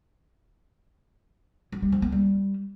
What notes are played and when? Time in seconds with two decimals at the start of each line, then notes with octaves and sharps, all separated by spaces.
1.72 F#3
1.82 G3
1.92 F3
2.02 A#3
2.12 G3